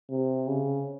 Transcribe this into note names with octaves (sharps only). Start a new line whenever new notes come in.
C3
C#3